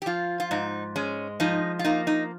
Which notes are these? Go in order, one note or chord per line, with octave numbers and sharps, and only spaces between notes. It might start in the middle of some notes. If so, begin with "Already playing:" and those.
G4
F3 F4
F4
G#2 D#4
G#3 C#4
F3 D#4
F4
A#3 D#4
D#4